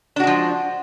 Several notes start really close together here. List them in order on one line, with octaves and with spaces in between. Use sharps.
D4 F#4 G#3 F3